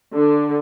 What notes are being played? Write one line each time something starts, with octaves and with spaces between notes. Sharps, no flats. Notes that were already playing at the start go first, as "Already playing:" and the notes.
D3